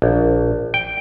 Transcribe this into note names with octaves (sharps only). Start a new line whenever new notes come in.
A#1
G5